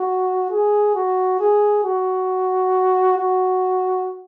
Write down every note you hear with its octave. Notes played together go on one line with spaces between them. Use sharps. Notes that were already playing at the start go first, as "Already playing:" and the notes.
Already playing: F#4
G#4
F#4
G#4
F#4
F#4